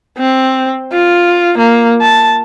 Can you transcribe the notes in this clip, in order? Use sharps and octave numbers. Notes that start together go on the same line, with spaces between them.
C4
F4
A#3
A5